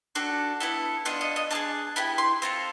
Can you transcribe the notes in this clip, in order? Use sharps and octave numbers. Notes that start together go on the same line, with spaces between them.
D4 F#4 A4
B3 E4 A4
B3 D4 F4 A4 D#5
D#5
D#5
D4 F4 G#4 A5
B3 E4 G4 B5
C6
C4 F4 A4